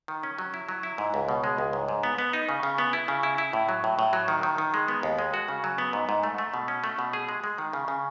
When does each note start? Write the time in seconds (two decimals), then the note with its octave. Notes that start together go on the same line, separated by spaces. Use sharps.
0.08 D#3
0.23 C#4
0.39 F#3
0.54 E4
0.69 F#3
0.83 E4
0.98 G#2
1.14 C#2
1.29 B2
1.44 G#3
1.58 C#2
1.73 G#2
1.88 G#2
2.03 B3
2.18 B3
2.33 D#4
2.49 C#3
2.63 C#3
2.78 B3
2.93 E4
3.08 C#3
3.23 E4
3.38 E4
3.53 A2
3.69 F#3
3.84 A2
3.99 A2
4.13 F#3
4.28 D#3
4.43 D#3
4.58 D#3
4.74 G#3
4.88 B3
5.03 D#2
5.19 G#3
5.34 F#4
5.48 C#3
5.64 F#3
5.78 B3
5.93 G#2
6.09 G#2
6.23 A3
6.38 A3
6.54 B2
6.68 C#4
6.84 A3
6.99 B2
7.13 G#4
7.29 G#3
7.44 G#3
7.58 D#3
7.73 C#3
7.88 C#3